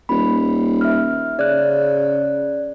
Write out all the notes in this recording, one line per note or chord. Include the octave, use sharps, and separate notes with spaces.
D#1 B5
E5 F6
C#3 D5 F#6